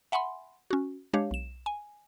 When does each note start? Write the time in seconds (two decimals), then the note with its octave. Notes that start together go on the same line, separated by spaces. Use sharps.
0.12 E5 F#5 G#5 B5 C6
0.71 C#4 F#4
1.13 G#3 D4 G4 C#5 F5
1.31 B1 E7
1.66 G#5